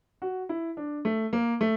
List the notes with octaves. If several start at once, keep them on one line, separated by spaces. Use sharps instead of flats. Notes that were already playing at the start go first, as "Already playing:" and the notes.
F#4
E4
D4
A3
A#3
A3